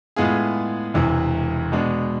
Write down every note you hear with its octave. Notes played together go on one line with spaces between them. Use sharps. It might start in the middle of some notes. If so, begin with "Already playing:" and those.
A2 G#3 B3 F4 G#4
E1 E2 C3 E3
B2 G#3 B3 D4